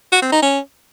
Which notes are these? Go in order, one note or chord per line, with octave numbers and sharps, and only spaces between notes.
F#4
C4
D#4
C#4